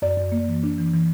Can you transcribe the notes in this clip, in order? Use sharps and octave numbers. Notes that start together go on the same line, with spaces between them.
F#2 D5
F#2
A#3
E3
D4
E3
E3